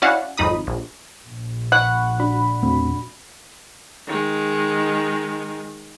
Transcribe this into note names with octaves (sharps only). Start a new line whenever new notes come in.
C#4 E4 F#4 D5 F5 F#5
G#1 F2 D#4 B5 D#6
A#1
A#1
F#5 B5 C#6 F#6
D4 F#4 B5
E1 A3 C4
D#3 G#3